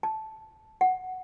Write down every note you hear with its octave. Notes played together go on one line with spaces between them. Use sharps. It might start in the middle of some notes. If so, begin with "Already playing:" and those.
A5
F#5